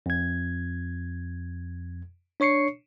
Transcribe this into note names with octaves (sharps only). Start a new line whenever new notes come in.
F2 G#6
D4 C#5 C#6 C7 C#7